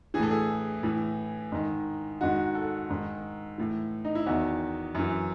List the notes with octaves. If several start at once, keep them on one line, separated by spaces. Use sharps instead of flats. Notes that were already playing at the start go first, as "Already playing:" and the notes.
E3 G#4
A2 A4
G#4
A2 E3
G#2 D#3
G#2 D#3 F#4
A4
G#2 D#3
A2 E3
D#4
E4
E2 D#3 F#4
F#2 E3